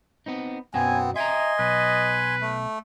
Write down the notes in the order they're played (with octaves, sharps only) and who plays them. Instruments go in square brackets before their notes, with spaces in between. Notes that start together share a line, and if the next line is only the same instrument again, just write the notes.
[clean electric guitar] B3 C4 D#4
[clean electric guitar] F#2 B2 F#3 [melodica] B3 C4 [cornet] G#5
[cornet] D#5 [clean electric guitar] E5 G5 A#5 [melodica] G#5 C6
[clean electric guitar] B1 [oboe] B4
[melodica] A3